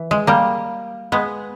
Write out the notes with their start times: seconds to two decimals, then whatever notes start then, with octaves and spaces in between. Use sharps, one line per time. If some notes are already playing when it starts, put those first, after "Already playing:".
Already playing: E3
0.11 G#3
0.27 G3 A#3
1.12 G#3 B3